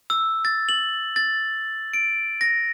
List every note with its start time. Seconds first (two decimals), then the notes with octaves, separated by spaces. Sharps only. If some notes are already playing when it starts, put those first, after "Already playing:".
0.10 E6
0.45 A6
0.69 F#7
1.16 A6
1.93 D7
2.41 A#6